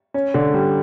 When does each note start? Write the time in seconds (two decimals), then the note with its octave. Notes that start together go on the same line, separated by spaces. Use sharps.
0.14 C#4
0.34 D3
0.53 G3